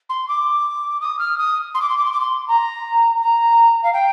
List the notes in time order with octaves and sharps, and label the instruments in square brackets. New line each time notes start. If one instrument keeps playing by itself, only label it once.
[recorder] C6
D6
D#6
F6
D#6
C6
D6
C6
D6
C6
D6
C6
A#5
A#5
F5
G5